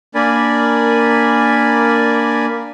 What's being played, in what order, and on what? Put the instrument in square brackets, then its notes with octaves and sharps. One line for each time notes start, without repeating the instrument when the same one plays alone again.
[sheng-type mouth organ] A#3 D4 A#4 D5 G#5 B5